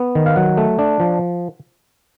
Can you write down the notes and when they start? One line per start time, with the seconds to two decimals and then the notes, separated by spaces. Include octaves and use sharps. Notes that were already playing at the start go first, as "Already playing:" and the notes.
Already playing: B3
0.15 D#3
0.26 F5
0.36 F#3 F#5
0.57 A3
0.79 D4
1.00 F3